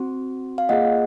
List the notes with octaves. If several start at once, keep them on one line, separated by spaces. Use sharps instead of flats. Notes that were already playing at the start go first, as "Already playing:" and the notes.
Already playing: C4 F#4
F5
A#3 F4 G#4 D#5 F#5